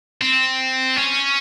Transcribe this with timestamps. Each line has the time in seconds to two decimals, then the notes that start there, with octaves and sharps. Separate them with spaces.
0.21 C4
0.96 C#4